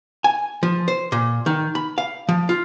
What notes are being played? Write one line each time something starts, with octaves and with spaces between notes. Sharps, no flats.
G#5
F3
C5
A#2
D#3
B5
F5
F3
F4